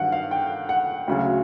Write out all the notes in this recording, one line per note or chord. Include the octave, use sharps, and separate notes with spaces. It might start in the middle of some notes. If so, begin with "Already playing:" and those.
Already playing: G2 D#3 F#3 F#5
F5
G5
F#5
D2 C#3 F#3